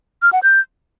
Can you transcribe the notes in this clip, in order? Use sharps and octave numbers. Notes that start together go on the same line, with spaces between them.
F6
F#5
G6